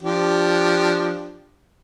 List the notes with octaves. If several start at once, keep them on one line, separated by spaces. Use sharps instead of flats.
F3 D4 G4